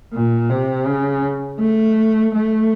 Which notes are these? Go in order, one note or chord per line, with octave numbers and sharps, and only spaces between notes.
A#2
C3
C#3
A3
A3